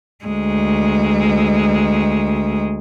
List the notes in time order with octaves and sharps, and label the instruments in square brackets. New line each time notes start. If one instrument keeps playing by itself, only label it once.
[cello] D2 G#3